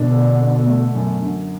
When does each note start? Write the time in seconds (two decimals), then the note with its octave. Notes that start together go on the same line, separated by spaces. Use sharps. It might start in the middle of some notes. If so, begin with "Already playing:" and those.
Already playing: B2 D3 D4
0.11 A4
0.39 B3
0.67 A3
0.94 F#2
1.22 D3